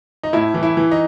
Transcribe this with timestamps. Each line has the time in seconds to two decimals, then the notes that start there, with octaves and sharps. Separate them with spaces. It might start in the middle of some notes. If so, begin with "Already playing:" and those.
0.23 D#4
0.33 A2 E4
0.54 E3
0.63 E4
0.77 E3
0.91 D#4